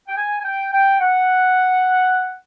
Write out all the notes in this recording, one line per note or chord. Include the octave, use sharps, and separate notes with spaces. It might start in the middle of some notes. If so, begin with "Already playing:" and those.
G5
G#5
G#5
G5
G5
F#5